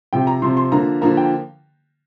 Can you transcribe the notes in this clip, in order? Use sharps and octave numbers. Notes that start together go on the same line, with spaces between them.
C3 F3 C4 G5
A#5
C3 F3 C4 C6
C6
D3 F3 A#3 A#5
D3 F3 A#3 A#5
G5